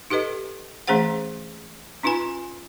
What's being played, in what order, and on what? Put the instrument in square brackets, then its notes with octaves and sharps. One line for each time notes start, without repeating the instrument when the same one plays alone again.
[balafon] D#4 G4 A4 B4 D#5
E3 A3 C#4 G#4 C5 F#5
C#4 D#4 F4 B4 G#5 B5